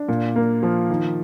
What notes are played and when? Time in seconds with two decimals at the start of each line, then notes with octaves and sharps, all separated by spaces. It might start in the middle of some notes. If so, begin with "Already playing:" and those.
Already playing: D4
0.08 A#2
0.36 A#3
0.63 F3
0.90 D#3